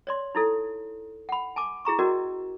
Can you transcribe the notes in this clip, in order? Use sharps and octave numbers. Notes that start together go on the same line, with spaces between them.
C#5 D5 C6
D#4 E4 A4
F#5 B5
G#5 A5 D6
E4 G#4 A#5 C#6
C#4 F#4 A#4 D5 D#5